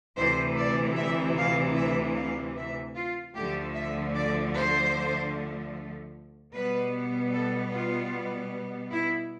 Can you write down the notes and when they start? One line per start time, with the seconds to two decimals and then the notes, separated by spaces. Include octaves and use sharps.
0.17 D2 C3 E3 C5
0.58 D5
0.97 E5
1.37 F5
1.76 E5
2.16 F5
2.56 E5
2.95 F4
3.35 D2 D3 F3 A3 G4
3.75 E5
4.15 D5
4.54 C5
6.53 B2 G3 B3 B4
7.33 A4
7.73 F4
8.91 E4